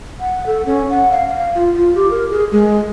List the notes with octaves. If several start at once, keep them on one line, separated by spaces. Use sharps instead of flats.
F#5
A4
C#4
F#5
F5
F5
F4
F4
G4
A#4
G#4
G#3